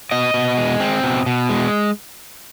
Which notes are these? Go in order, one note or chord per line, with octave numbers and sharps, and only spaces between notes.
B2 D#5
B2
G#3
C4
B2
B2
G#3